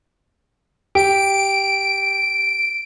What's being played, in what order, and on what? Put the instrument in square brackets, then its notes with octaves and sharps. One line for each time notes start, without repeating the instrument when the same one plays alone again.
[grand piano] G4 [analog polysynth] D7